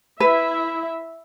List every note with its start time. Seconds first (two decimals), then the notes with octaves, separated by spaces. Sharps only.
0.20 E4 B4 E5